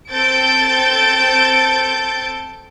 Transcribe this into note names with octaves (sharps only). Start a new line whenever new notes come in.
C4 A4 G6 A6 D7